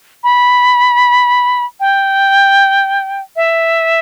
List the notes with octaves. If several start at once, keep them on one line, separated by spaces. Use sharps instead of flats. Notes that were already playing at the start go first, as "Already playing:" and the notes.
B5
G5
E5